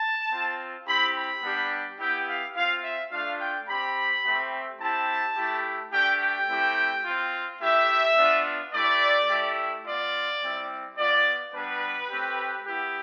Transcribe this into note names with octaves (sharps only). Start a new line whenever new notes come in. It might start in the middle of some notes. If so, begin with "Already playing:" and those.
Already playing: A5
C4 F4
C4 E4 G4 B5
B5
G3 B3 D4 G4
B3 E4 G4 G5
F5
C4 F4 F5
E5
A3 D4 F4 F5
G5
C4 G4 B5
A3 C4 G4
C4 E4 G4 A5
A3 E4 G4
A3 D4 G4 G5
G5
A3 C4 E4 G4
C4 F4
A3 E4 G4 E5
B3 D4 F4
A3 E4 G4 D5
A3 E4 G4
B3 F4 D5
G3 C4 E4
B3 F4 D5
G3 B3 D4 B4
A3 C4 G4
B3 E4 G4